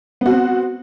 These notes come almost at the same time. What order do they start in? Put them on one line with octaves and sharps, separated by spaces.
B3 F#4 C4